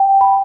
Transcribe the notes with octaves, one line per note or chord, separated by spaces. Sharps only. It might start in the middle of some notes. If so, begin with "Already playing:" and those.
Already playing: G5
B5